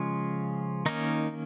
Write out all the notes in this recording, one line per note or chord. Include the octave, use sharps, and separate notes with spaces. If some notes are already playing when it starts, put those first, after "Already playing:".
Already playing: C#3 F3 G#3 C#4 F4
D#3 A#3 C#4 D#4